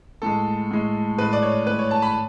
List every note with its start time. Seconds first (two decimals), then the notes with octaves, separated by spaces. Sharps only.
0.22 A2 G#3 A4
0.71 A2 G#3
1.18 A2 G#3 B4
1.33 D5
1.43 C#5
1.66 A2 G#3 B4
1.79 C#5
1.91 A5
2.02 B5